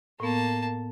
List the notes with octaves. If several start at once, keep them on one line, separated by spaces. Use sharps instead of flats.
A2 A#3 B3 A5